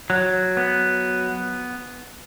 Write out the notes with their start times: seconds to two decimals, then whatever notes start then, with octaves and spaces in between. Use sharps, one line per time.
0.10 F#3
0.57 B3